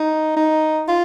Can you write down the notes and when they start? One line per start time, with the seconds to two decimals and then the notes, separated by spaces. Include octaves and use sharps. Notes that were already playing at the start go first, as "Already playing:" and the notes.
Already playing: D#4
0.37 D#4
0.88 F4